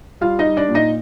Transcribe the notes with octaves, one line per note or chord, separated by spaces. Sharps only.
G3 F4 F5
D#4 D#5
G3
D4 D5
A#2
D#4 D#5